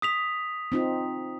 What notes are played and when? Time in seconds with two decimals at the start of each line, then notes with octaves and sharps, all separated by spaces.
0.02 D#6 B6 F7
0.72 C4 D#4 F4